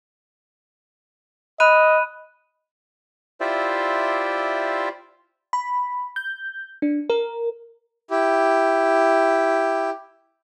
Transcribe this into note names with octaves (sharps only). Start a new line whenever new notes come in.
D#5 B5 F#6 D#7
E4 F4 G4 C5 D5 E5
B5
G6
D4
A#4
E4 G4